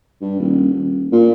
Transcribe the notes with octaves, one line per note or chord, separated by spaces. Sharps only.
G2
D#1
D#1
A#2